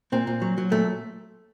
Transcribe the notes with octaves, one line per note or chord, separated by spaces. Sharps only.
A#2 C4
A#2
F#3
F#3
A#2 A3